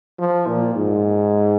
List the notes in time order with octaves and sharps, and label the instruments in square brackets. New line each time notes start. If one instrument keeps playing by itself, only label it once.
[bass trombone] F3
A#2
G#2